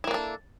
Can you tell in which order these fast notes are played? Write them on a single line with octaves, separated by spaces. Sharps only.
E4 A#3 D4 A4